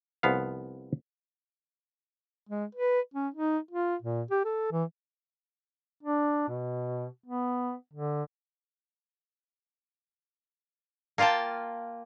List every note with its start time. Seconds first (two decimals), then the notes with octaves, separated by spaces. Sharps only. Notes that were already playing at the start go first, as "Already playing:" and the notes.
0.23 C2 F3 B3 F5
2.49 G#3
2.75 B4
3.14 C#4
3.34 D#4
3.71 F4
4.02 A#2
4.31 G4
4.45 A4
4.72 E3
6.03 D4
6.48 B2
7.26 B3
7.93 D3
11.18 A#3 F4 F5 G5 A5